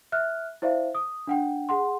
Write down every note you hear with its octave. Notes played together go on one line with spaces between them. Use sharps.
E5 F6 F#6
E4 C5 D5 E5 F5
D#6
D4 F#5 G5
G#4 F#5 C6